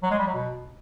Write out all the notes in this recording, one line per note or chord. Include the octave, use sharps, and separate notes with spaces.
F#3
G#3
G3
F#3
B2